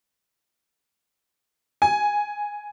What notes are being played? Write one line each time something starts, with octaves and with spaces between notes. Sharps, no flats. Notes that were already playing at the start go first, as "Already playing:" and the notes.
G#5